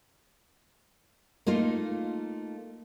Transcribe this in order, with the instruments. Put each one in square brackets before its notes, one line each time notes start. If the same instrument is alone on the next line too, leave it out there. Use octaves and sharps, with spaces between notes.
[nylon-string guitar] A3 A#3 D#4 F4